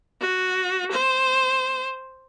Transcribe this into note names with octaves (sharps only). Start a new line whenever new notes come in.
F#4
C5